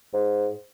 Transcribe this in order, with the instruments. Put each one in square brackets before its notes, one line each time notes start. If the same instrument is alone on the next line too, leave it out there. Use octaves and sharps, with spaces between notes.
[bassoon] G#2